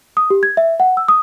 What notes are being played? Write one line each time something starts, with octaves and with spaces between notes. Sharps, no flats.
D#6
G4
G#6
E5
F#5
E6
D#6